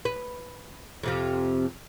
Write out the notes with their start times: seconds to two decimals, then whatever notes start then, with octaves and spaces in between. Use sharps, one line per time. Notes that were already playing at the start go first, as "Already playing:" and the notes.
0.05 B4
1.03 F2 C3 F3